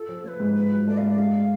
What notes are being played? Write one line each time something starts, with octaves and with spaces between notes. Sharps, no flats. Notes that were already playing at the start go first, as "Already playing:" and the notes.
Already playing: F4 A4
F3
A3 B4 C#5
G#2
F4 B4
F#3
A3 D5
G#2 F5
D5
G#3 F5